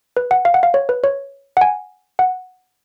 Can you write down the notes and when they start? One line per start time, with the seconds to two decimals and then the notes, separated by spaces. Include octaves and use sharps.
0.17 B4
0.31 F#5
0.45 F5
0.54 F#5
0.63 F5
0.74 C#5
0.89 B4
1.04 C#5
1.57 F#5
1.61 G#5
2.19 F#5